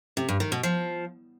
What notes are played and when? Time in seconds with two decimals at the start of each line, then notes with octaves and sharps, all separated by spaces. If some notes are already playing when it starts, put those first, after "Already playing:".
0.17 C3
0.29 G2
0.40 D#3
0.52 B2
0.63 F3